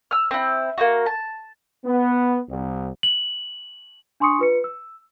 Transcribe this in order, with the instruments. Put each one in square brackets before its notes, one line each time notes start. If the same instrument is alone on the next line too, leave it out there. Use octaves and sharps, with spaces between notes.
[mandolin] E6 F6
C4 E4
A#3 D#4 F#4
A5
[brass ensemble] B3
C2
[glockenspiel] F#7
[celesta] D4 G#5 C6 C#6 D#6 C#7
F4 B4 C#7
E6